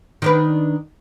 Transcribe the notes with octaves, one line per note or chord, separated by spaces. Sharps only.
D#3 D4 B4